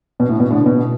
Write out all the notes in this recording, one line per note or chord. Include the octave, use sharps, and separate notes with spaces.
B2
A2
B2
A2 D3
B2